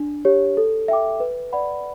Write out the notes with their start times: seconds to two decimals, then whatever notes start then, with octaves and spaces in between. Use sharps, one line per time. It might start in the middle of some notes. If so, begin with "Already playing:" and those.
Already playing: D4
0.25 G4 C#5
0.57 A4
0.88 E5 G5 D6
1.20 B4
1.52 D5 F#5 B5